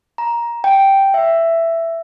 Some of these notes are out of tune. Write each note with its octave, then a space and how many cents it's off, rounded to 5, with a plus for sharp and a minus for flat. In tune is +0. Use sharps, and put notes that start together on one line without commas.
A#5 +15
G5 -5
E5 +10